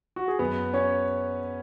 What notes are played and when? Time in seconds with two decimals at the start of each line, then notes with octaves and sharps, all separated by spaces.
0.16 F#4
0.28 G#4
0.39 F#2 F#3 B3 B4
0.73 C#4 C#5